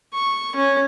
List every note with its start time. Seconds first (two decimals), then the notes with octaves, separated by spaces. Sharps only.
0.14 C#6
0.55 C#4